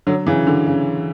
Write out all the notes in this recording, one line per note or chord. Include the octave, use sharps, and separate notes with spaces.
D3 F#3
C#3 E3
D3
C#3